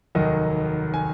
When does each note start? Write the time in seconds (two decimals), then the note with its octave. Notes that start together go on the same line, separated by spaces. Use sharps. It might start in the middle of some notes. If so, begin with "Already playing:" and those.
0.15 F1 D#2 D#3 F#3 D#5
0.94 G#5